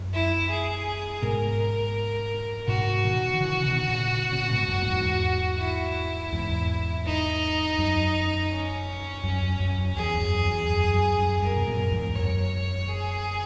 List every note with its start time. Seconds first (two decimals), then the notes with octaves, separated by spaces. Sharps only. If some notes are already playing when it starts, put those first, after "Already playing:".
Already playing: F#2
0.13 E4
0.50 G#4
1.22 G#2 B2 A#4
2.68 G#2 B2 F#4
3.04 B2 D#3
3.34 D#3
3.41 C#3 E3
3.66 B2 D#3
3.89 A#2 C#3
4.32 A#2 C#3
4.51 G#2 B2
4.68 F#2 A#2
4.79 A#2
4.87 E2 G#2
5.59 E4
6.33 E2 G#2
7.05 D#4
7.79 F#2
8.51 C#4
9.24 F#2
9.60 F#2
9.97 E2 G#4
10.21 F#2
10.46 E2
10.70 F#2
10.94 F#2
11.19 F#2
11.42 F#2 A#4
11.56 B2
11.67 F#2 A#2
11.91 E2 G#2
12.15 F#2 C#5
12.89 G#4